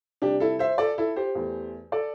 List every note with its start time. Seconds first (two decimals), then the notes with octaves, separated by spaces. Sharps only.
0.22 C3 G3 D4 G4
0.40 E4 A4
0.59 C5 E5
0.78 A4 D5
0.98 E4 A4
1.16 G4 C5
1.35 E2 E3 A3
1.92 A4 D5